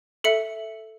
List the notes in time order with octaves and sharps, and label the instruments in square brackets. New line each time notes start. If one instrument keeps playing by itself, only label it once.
[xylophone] A4 E5 C#7